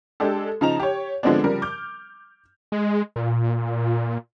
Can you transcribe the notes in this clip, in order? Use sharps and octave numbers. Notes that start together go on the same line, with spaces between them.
G#3 D4 G4 A4
C#3 F3 D#4 A5 A#5 F7
G4 C#5
D3 F3 G#3 B3 C4 D4
C#3 F3 G3 A#4
D6 F6 G6
G#3
A#2